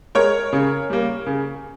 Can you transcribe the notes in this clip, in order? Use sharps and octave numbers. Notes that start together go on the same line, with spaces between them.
G#3 A#4 C#5
C#3
G3 A#3
C#3